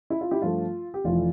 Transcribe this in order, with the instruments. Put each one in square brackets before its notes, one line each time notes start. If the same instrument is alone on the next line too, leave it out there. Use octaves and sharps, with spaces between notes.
[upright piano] E4
F4
E4 G4
G2 F3 A3 F4
G4
F1 F2 E3 F4